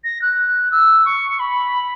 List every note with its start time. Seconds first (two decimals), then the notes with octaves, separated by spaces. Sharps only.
0.04 A#6
0.21 F#6
0.71 E6
1.05 C#6
1.39 B5